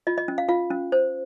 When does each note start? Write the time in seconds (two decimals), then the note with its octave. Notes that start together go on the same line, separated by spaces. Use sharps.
0.07 F4 D#5
0.18 D#5
0.28 C#4
0.38 F5
0.49 F4 F5
0.71 C#4
0.92 C5